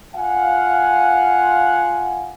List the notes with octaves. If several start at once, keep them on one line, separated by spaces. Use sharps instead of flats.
F4 F5 F#5 G#5